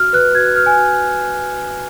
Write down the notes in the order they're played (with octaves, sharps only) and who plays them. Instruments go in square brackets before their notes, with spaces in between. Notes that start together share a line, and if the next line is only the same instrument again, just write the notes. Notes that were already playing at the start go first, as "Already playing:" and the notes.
Already playing: [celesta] F#4 F6
B4 F#6
F#4 G#6
F#6
B4 F6
G#5
F#4